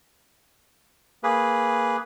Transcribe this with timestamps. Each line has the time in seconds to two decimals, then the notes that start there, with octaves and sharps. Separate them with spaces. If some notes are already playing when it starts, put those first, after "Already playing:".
1.23 A#3 G#4 B4